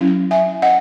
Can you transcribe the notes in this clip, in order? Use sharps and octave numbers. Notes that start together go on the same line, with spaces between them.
F#3 C#4 E4
E5 G#5
D#5 F#5